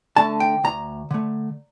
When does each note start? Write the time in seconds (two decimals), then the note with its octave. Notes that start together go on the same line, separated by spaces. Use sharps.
0.17 D3 A3 A5
0.40 G5
0.64 D2 A#5
1.11 D3 A3